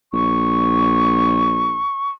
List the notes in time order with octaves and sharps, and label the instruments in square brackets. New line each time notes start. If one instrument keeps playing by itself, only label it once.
[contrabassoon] A#1 [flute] C#6